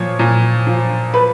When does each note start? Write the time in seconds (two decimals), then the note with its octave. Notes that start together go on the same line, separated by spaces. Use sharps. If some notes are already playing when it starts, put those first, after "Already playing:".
Already playing: A#2 F3 C#5
0.19 A#2
0.67 F3
1.14 B4